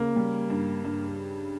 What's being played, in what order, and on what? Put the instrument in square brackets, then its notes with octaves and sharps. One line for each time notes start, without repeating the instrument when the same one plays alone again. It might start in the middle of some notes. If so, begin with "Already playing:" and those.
Already playing: [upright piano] C#3 [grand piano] A#3
[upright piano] G3
G2
G2